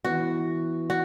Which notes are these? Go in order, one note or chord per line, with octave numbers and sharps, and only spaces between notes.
E3 B3 E4 F#4
F#4